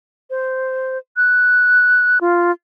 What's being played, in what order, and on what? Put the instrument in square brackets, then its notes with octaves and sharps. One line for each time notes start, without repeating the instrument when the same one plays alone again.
[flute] C5
F#6
F4